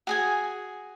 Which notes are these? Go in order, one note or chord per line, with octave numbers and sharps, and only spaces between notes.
F#4 G#4 G#5